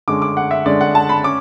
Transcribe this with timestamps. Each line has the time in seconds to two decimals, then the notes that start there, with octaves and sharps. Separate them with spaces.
0.08 D3 G#3 C#4 D6
0.22 D6
0.37 F#5
0.51 E5
0.65 D3 G#3 C#4 D5
0.81 F#5
0.95 A5
1.09 B5
1.24 C#4 D6